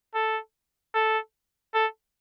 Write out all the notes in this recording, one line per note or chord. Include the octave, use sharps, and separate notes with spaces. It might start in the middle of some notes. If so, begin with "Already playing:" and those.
A4
A4
A4